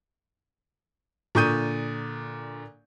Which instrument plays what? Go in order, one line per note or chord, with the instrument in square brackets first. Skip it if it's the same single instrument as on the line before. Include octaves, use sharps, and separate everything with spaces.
[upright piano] A#2 D3 C#6 D#6 G6 D#7